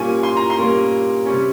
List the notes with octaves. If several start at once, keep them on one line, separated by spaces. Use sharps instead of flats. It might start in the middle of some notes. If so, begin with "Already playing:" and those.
Already playing: A#2 G3 A#3 C#4 G#5
C6
A#5
C6
A#2 G3 A#3 C#4
C3 G3 C#4